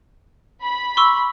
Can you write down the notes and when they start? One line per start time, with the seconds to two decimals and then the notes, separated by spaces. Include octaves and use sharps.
0.64 B5
0.97 C6 C#6 E6